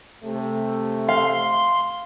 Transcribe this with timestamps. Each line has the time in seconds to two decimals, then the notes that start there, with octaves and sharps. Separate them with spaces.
0.23 C3 A3
1.09 F5 C6